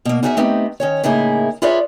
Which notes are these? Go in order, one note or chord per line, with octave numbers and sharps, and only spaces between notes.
B2 A#3
D#4 F#4 G#4 A#4 D#5 E5
A3 B3 C4 D#4 G4
D#3 C#4 C#5
A2 C#3 A#3 D#4 E4 G#4
F4 G#4 B4 C#5 D5 E5